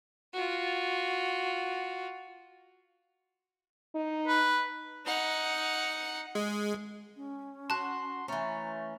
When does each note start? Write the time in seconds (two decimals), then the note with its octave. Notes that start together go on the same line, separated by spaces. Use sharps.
0.33 F4 F#4
3.95 D#4
4.28 B4
5.05 D#4 F#5
6.35 G#3
7.16 C#4
7.70 F#4 A5 C6 F#6
8.28 E3 A3 C#4 A#5